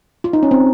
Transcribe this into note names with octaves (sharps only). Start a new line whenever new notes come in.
F4
D#4
C#4
C4